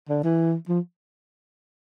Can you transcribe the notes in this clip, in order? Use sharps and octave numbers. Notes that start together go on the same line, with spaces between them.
D3
E3
F3